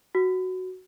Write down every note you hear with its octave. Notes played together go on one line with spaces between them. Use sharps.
F#4